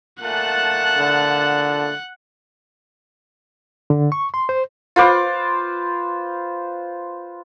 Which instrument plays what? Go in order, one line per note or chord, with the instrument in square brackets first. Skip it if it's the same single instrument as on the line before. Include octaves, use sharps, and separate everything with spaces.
[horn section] A#2 A3 A5 [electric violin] F#5 F#6
[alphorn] D3
[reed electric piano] D3
C#6
C6
C5
[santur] F4 B4 C5 D6